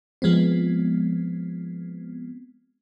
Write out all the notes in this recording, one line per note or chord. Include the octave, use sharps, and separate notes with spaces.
F3 G#3 B3 C4